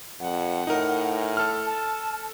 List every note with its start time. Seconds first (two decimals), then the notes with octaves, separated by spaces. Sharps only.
0.20 F2 F#5
0.67 A2 D#4 A#4
1.37 A4 F6
1.66 A5